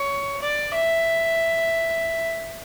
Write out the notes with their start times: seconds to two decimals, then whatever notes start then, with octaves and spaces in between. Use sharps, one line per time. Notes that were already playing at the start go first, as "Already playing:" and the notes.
Already playing: C#5
0.42 D5
0.75 E5